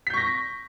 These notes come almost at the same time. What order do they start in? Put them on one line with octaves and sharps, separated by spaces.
B6 G6 C#6 A#6